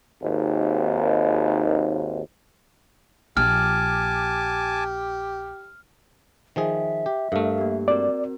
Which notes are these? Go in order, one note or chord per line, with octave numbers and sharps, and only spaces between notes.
G#1 D#2
A#1 G4 G#5 A5 D6 F6
D#3 F3 G#4 E5
G4
G2 A3 A4 A#4 F5
A#3 G4
C4 F#4 A#4 D5